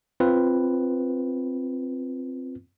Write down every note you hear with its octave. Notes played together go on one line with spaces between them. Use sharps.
C4 F4 B4